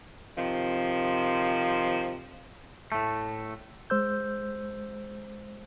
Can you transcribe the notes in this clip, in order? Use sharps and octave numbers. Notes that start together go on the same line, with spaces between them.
C3 D#3 F3
A2 A3
G#3 C5 E6 G6